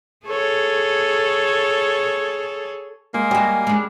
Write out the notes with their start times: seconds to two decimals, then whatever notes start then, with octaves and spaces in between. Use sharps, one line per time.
0.26 G#4 A4 C#5
3.14 G#3 A#3
3.31 G3 F#4 D#5 G#5
3.67 G#3 D4